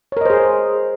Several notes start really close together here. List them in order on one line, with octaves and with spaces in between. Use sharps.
C#5 A#4 D#5 C5 G#4